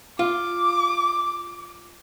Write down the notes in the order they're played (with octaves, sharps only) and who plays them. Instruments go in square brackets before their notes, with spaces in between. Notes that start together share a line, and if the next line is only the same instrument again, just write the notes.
[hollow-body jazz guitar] F4 [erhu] D6